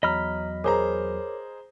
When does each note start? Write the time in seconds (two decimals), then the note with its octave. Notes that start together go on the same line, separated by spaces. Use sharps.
0.03 E2 F#3 C#5 D#5 A#5 B5 F6 B6
0.64 G#4 A#4 C5 C#5 A#5 D6